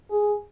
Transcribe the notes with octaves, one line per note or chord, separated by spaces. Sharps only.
G#4